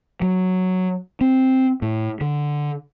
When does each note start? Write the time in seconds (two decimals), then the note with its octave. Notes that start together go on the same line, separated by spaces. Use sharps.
0.22 F#3
1.21 C4
1.82 A2
2.21 D3